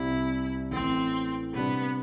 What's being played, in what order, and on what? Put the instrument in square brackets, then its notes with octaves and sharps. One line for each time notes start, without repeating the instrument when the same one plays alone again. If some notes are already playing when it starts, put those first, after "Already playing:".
Already playing: [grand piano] C2 C3 G3 [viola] E4
[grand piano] A1 A2 E3 [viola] C4
[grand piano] C3 G3 D4 [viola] B3